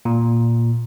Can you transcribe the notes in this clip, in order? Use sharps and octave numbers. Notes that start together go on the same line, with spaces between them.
A#2